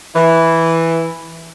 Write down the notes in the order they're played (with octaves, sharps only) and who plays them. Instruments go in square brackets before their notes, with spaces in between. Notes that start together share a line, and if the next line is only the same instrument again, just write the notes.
[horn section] E3